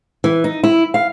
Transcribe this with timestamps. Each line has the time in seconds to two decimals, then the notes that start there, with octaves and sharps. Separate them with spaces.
0.24 E3
0.44 D#4
0.64 E4
0.94 F5